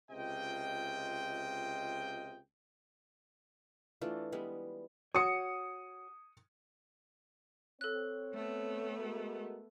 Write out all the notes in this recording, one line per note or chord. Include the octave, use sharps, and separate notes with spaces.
C#2 C3 F4 D#5 G5
E3 A3 D4 F4
G3 G#3 B3
F#4 C#5 D#6 C#7
C4 A4 C#5 F#6
A3 B3
G#3 F#4 A#4